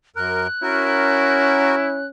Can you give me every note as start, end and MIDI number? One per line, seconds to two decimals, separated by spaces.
0.16 0.47 42
0.16 0.47 70
0.16 2.06 90
0.63 2.09 61
0.63 2.02 64
0.63 1.76 66
0.63 1.76 70